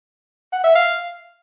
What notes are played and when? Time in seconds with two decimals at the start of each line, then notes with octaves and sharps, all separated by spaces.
0.53 F#5
0.64 E5
0.76 F5